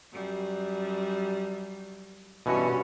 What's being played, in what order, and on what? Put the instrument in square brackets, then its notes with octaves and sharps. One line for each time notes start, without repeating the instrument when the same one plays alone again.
[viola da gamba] F#2 G3
[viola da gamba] G2 C#4 [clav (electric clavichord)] B2 E3 F#4